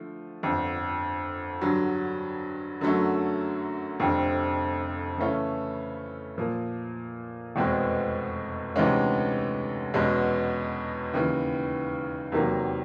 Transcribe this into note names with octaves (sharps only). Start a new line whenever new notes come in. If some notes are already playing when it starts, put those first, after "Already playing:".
Already playing: D3 F3 A3
G1 F2 D3
G2 D3 F#3
F#2 D3 F#3 A3
F1 F2 D3 G3 C4
C#3 E3 A3 C#4 E4
A#2 F3 A#3
F1 E2 B2 G#3 C4
D2 C3 E3 G#3 C#4
E2 B2 G#3 C#4
D#2 C#3 E3
E2 C3 D#3 F#3 A#3